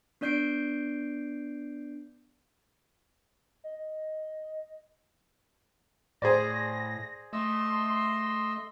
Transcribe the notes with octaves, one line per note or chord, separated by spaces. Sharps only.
B3 D4 D5 G6 C7 D7
D#5
A2 G#4 C5 D5 A#6
A3 D#5 C6 E6